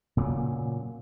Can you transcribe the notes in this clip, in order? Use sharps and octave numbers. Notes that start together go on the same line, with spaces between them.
A#2 C#3 F#3